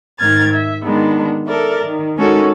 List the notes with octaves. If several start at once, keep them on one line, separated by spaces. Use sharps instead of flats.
G#2 D#3 F6 G#6 A6
E5
D#3 G#3 B3 D4
A4 A#4 D5 E5
D#3
G#3 C#4 D#4 F#4 A4 A#4